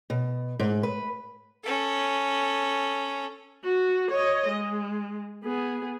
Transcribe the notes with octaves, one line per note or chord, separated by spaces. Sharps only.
B2
G#2
B4
C#4 A4
F#4
C#5 D#5
G#3
B3 G#4